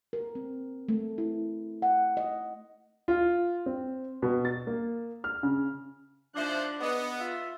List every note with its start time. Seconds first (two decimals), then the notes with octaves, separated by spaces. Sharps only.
0.13 A#4
0.35 C4
0.89 A3
1.18 E4
1.82 F#5
2.17 D#5
3.08 F4
3.66 C4
4.22 B2
4.45 A6
4.67 A#3
5.24 F6
5.43 C#3
6.35 F3 D4 D#4 C5 E5 D6 F#6
6.80 B3 G#4 D#5
7.20 F4 E5